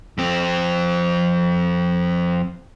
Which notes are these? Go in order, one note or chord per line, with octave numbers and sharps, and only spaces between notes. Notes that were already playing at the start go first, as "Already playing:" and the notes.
F2 C4